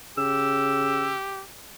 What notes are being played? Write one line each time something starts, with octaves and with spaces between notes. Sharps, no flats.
C#3 G4 E6